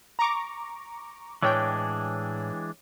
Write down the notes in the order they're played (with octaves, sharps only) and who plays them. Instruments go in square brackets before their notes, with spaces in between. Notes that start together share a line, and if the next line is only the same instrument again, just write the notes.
[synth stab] A#5 C#6 D6
[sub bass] A2 [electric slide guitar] E3 G#3 D4 [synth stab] C#5 G5